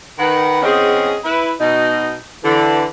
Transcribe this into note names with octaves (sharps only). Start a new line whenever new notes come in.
D#3 B4 F#5
E2 C4 C#4 G#4 D#5 F#5
E4 B4
B2 D#4
D3 E3